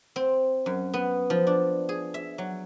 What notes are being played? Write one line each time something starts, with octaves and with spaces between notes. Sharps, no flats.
C4
F#2
B3
F3
D4
G#4
E5
F#3